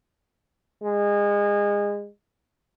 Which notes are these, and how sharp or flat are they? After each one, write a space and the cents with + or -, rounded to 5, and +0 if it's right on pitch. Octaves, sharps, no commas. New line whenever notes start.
G#3 -25